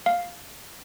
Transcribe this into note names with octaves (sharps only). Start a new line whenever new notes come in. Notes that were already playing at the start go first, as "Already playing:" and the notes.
F5